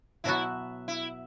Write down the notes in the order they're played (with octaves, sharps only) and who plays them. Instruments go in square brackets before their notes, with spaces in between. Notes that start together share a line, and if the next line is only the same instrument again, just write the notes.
[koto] B2 F#3 B3 F#4 [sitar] E4
[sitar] E4